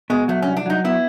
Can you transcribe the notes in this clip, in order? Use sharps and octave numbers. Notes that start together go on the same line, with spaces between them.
B2 G#3
F#3 A3
C2 C#4
D4
F#3 D#4
B3 E4